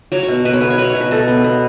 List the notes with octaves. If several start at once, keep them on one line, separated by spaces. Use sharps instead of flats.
F#3 C#5
C#5
B2
B2 B4
C#5
B3 B4
C#5
F#3 B4
C#5
B2
B4
B2 A4
B3
B3